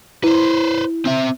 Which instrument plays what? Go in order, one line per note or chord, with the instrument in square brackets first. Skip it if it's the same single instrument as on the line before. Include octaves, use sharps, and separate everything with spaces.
[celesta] E4 [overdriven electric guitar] B4 C5
[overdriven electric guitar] C4 E5